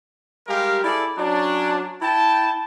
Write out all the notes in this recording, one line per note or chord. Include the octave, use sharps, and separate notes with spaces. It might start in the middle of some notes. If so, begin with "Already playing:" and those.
G3 G#3 G4 A#4 F5
E4 G#4 A4 D5
F#3 C#4 D4
E4 G5 A5